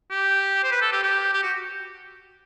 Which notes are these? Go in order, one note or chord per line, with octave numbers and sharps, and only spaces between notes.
G4
C5
B4
A4
G4
G4
G4
F#4